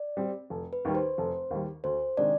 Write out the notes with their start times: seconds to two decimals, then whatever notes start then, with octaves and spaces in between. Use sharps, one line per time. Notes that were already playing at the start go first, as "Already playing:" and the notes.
Already playing: D5
0.17 G3 C4
0.50 F1
0.73 B4
0.85 D#2 D#3 G3
0.95 C5
1.18 F1
1.51 D#2 D#3 G3
1.84 D2 C5
2.17 C3 D#3 G#3 D4 D5